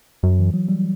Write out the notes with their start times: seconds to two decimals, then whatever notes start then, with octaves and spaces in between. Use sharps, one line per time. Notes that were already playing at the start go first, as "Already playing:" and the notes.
0.23 F#2 F#3
0.39 E3
0.54 F#3
0.68 G3